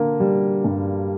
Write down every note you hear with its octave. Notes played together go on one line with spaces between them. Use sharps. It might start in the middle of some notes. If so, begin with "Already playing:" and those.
Already playing: D3 A#3
G3
G2